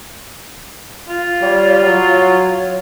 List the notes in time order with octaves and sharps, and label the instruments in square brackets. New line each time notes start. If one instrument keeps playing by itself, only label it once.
[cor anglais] F4
[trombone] G3 [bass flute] C#5
[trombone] F#3 [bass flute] C#5